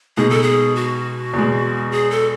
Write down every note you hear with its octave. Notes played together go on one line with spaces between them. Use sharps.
B2 G#3 D#4 G#4
A4
G#4
F#4
E2 B2 G#3
G#4
A4